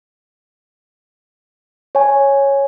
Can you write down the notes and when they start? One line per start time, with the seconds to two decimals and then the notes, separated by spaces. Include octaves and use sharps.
1.95 C#5 G#5